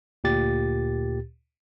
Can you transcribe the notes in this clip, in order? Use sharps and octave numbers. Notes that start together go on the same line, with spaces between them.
D2 A#2 G4 A6